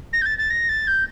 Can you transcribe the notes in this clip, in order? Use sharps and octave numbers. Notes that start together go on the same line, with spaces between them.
A#6
G6
A6
A6
A#6
A6
G6